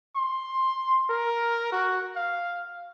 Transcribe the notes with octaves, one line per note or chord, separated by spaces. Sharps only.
C6
A#4
F#4
F5